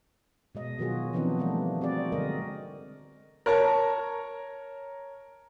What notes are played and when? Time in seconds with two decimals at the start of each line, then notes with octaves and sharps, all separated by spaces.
0.55 B2 G#3 D#5
0.79 B2 D#3 F#3 F4 F#4 G#4
1.13 E3 F3 B3 C4 D4 D#4
1.39 G3 A3 A#3 D4
1.81 C4 F#4 G#4 D5
2.12 D3 F#3 G#3 A#4 D#5
3.46 A#4 C#5 A5 A#5